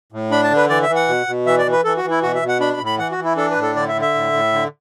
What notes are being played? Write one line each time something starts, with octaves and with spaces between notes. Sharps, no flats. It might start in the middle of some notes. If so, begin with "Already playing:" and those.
A2
D4 B5
A5
D3
B4
E3 D5
E5
E3
F#5
B2
B2
E3 E5
D5
E3
B4
E3 A4
F#4
E3
E4
B2 F#4
E5
B2
F#5
D4 B5
B5
A2
B5
E3 F#5
F#4
E3
E4
D4 A4
B4
A2
A4
D3 D5
E5
D3
E5
A2
A2
D3